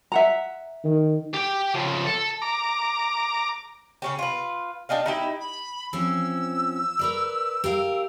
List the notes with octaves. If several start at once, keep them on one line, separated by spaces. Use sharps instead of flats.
E5 F#5 A#5
D#3
G4 G5
C#3 F3
A4
A#5 D6
C#3 C#4 G4
F4 B4
D4 G4 D#5 F5
D#4 E4 G4
B5
F3 C4 C#4 E6
A#4 B4 D5
G4 A#4 F5